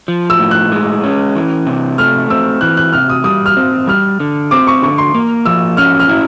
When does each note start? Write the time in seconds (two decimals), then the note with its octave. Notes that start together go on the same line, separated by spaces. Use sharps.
0.08 F3
0.30 E6
0.39 A2
0.51 F#6
0.72 G#3
1.04 C#4
1.35 E3
1.66 C3
1.98 A3 F6
2.30 C4 E6
2.61 E3 F#6
2.77 F#6
2.92 C3 F6
3.10 D#6
3.24 G3 D#6
3.46 F6
3.57 C4
3.87 G3 F6
4.20 D3
4.51 C4 D6
4.67 C#6
4.82 D3 C#6
4.98 C6
5.15 A#3
5.46 F3 E6
5.77 C#4 F6
5.99 F6
6.09 E4